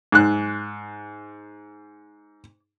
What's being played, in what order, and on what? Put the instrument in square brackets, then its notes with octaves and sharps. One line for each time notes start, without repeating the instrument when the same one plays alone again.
[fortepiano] G#2 F#6